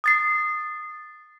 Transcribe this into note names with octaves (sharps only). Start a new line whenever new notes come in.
D#6 A6 C7